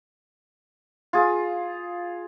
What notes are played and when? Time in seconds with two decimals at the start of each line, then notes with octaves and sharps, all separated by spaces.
1.13 F4 G#4